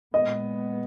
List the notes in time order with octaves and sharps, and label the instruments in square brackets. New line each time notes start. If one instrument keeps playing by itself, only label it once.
[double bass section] A#2 G#3 B3 [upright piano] D#5